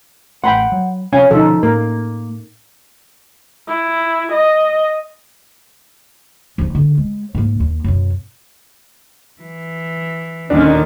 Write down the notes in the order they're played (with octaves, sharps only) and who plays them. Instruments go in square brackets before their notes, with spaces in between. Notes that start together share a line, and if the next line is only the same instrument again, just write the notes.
[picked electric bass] A1 A3 [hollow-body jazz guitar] F#5 [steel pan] G5 B5 C6
[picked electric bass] F#3
[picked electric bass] C3 F3 C4 [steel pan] C#4 [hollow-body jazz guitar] C#5 F5 G#5
[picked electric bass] B2 D3 [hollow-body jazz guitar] F3 [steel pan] D#4 A4
[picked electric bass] A2 [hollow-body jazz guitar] A#3 [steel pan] A#4
[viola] E4
D#5
[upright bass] F3 D#4
D3
G#3
G#2 A#3
D#2
F#2 B2
[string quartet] E3
[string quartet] D#2 A#2 D3 [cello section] D#3 [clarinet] C#4 [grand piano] D4